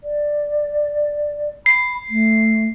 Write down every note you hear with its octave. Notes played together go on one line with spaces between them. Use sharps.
D5
B5 C7
A3